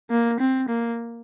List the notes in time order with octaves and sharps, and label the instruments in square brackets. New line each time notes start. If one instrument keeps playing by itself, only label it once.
[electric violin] A#3
C4
A#3